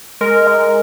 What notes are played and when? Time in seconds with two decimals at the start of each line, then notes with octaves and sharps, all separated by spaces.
0.21 G#3 A#4
0.47 G#3